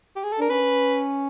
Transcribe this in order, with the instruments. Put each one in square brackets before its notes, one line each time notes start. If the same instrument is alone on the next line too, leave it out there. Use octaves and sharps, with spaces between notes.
[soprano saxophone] G4
G#4
A4
[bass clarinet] D4 [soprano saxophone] A#4
[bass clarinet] C#4 [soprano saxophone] B4